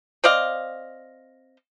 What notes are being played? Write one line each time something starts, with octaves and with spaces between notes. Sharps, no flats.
C4 D5 D#5 F5